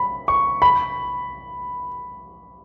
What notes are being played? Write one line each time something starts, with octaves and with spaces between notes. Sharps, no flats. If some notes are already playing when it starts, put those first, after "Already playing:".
Already playing: B5
C#6
B5